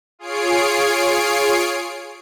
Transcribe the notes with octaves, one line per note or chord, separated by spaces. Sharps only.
F4 G#4 C#5 C7 D7